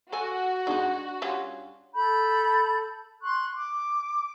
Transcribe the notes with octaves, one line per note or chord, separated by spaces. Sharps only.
F#4 A4 F#5 G#5
G#3 D4 D#4 G#4
G3 C#4 F4
A4 B5 G6
C6 C#6 F#6
D6